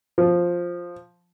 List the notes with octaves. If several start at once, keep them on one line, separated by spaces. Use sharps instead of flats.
F3